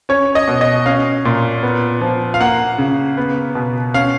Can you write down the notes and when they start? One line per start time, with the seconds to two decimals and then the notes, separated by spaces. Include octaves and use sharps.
0.09 C#4 C#5
0.35 D#5
0.47 B2
0.61 D#5
0.86 C#4 F5
1.25 A#2
1.63 B3
2.01 F3
2.34 F5
2.40 A#3 F#5
2.78 C#3
3.17 B3
3.55 B2
3.94 C#4 F5